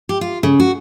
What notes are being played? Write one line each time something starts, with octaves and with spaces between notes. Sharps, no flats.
G4
F4
C#3
F#4